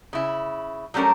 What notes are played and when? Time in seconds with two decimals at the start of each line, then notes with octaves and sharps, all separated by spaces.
0.13 C#3 E4
0.94 F#3 G3 A3 C#4 D4 A#4